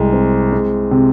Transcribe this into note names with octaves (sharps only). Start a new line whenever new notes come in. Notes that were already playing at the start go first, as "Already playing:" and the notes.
Already playing: C2 G#3
C4
G#3
C3